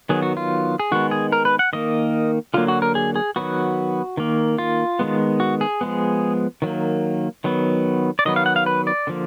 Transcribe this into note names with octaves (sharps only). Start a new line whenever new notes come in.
D#3 F#3 B3 G#4
F#4
F4
G#4
D#3 G#3 B3 F#4
G#4
A#4
B4
F#5
D#3 A#3 D#5
D3 F#3 A#3 F4
F#4
A#4
G#4
G#4
D#3 F#3 B3 F#4
D#3 A#3
F4
D#3 G#3 B3
F#4
G#4
F3 G#3 B3
D#3 F#3 A#3
D#3 F#3 B3
D5
D#3 F#3 B3 D#5
F5
F#5
F5
B4
D5
D3 F3 A#3